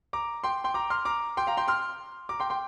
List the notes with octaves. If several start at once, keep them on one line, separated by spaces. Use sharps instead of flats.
A#5 D6
G5 C6
G5 C6
A#5 D6
C6 F6
A#5 D6
G5 C6
F5 A#5
G5 C6
C6 F6
A#5 D6
G5 C6
G5 C6